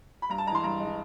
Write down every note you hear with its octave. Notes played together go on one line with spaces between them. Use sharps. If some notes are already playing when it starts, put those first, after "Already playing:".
B5
G2 A#5
A5
E3 G#3 A#5 C6
G2 A#5
E3 G#3